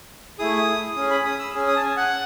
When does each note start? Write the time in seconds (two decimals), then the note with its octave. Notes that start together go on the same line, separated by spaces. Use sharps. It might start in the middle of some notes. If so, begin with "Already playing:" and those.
0.39 A3 E4 G#4 D#6
0.96 C#4 G#4 D#6
1.11 B5
1.25 D#6
1.39 E6
1.54 C#4 G#4
1.68 D#6
1.76 A5
1.83 G#5
1.97 F#5